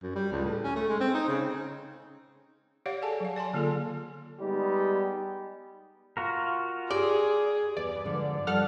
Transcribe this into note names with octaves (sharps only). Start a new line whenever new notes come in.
F#2
G3
C#2
A2
C#4
A3
G#3
C4
D#4
C#3
G4 C#5 D5 F5 F#5
G#4 A4 C#5 G#5 A5
F#3 F5
D5 G#5 A5 C6
D3 A#3 F4 G#4 A4
G3 G#3 B3 D#4 G4
F4 F#4 A#4
G4 G#4 D5
E2 D5
B4 D#5
G#2 D3 F3
F3 G3 A4 D5 F#5 F6